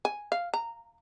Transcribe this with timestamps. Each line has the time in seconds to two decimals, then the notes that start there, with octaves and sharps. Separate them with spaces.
0.05 G#5
0.32 F5
0.54 A#5